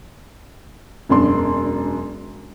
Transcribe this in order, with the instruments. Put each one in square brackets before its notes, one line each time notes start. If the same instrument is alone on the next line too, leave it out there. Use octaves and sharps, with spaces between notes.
[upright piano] E1 F#2 D4 C6